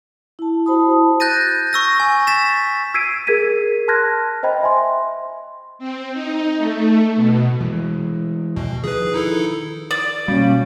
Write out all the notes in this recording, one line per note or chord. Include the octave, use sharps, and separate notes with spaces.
E4 A5
E4 F#4 C5 A5 B5 D#6
F#6 G6 A6 A#6 D#7
C#6 E6 A#6
G#5
A6 B6 E7
E6 G#6 B6 C7 D7 D#7
G#4 A#4 G#6 B6 D#7
A5 C6 F6 F#6 G#6 A#6
C5 D#5 G5 B5
E5 G#5 C6
C4
D#4
A3
B2
E3 G#3
D#2 B2
D#3 F3 G#4 B4
D#4 E4 A4
D5
B2 G3 A#3 C#4